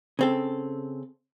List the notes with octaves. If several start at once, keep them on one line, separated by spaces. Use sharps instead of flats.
C#3 C4 A4